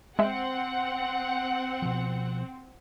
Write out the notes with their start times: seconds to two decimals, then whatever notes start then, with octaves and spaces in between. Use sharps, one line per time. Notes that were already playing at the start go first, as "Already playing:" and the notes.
0.19 G#3 C4 E5 F#5
1.82 B2 F3